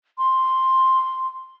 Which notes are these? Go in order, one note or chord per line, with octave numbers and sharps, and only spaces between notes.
C6